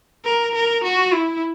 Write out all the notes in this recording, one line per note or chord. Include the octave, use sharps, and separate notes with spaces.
A#4
A#4
F#4
E4